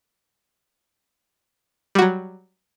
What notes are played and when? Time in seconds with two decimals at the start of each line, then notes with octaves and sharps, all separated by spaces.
1.95 G3
1.99 F#4
2.02 F#3